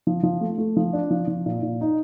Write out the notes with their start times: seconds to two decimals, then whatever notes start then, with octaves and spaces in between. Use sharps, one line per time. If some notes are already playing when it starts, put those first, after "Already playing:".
0.07 F3
0.23 F3
0.41 A3
0.58 A3
0.77 F3
0.93 D4
1.11 F3
1.28 F3
1.46 A#2
1.63 A#2
1.81 D#4